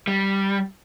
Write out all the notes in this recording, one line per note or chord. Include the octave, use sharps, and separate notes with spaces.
G3